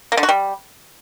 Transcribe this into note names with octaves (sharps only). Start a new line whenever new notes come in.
A#3
D3
F#4
G3